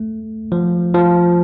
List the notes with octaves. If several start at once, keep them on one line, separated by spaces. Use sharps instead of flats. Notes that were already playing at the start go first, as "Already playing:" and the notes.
Already playing: A3
F3
F3